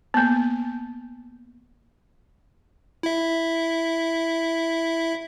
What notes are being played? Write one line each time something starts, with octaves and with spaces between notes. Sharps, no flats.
A#3 B3
E4 E5